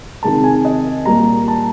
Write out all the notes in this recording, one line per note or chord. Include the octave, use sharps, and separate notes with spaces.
C3 D#3 G#3 A5
G#5
D#5
A#2 G3 A#3 A#5
A5